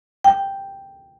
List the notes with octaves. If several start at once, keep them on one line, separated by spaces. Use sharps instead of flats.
G5